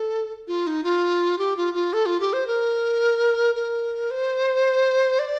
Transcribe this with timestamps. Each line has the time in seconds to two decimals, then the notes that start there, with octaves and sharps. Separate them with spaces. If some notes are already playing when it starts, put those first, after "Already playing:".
Already playing: A4
0.48 F4
0.67 D#4
0.84 F4
1.38 G4
1.57 F4
1.74 F4
1.93 A4
2.06 F4
2.20 G4
2.33 C5
2.47 A#4
3.55 A#4
4.11 C5
5.19 D5